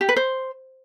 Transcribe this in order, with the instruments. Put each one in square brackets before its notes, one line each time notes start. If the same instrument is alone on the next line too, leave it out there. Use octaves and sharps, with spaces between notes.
[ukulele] G4
B4
C5